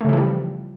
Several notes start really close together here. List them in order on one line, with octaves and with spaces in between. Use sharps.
A3 C#3 E3 F3 G3